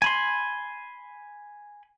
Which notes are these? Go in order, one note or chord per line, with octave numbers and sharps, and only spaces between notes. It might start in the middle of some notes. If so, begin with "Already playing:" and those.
G#5 B5 C6